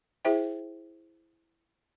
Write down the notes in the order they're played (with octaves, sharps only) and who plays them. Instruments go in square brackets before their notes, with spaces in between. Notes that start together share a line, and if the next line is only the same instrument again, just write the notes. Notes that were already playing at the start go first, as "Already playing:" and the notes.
[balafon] E4 G#4 C5 E5 G5